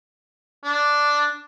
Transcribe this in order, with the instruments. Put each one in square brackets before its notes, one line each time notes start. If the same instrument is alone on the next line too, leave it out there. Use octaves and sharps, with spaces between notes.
[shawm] D4